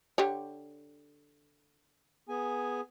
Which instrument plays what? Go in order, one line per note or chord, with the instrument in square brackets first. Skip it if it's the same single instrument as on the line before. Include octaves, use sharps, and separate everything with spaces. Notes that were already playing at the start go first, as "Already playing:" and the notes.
[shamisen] D3 G4 C#5
[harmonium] B3 G#4 G#5